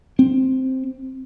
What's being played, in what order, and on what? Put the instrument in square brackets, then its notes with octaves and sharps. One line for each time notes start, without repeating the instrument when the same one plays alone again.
[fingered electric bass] C4